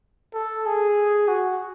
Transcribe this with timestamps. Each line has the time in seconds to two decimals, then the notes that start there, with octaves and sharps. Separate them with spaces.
0.34 A4
0.66 G#4
1.28 F#4